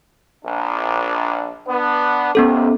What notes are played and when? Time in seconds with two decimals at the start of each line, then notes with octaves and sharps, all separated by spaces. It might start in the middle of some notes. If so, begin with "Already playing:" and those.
0.45 A#1 D4
1.67 B3 D4
2.35 D#2 C3 B3 C#4 A4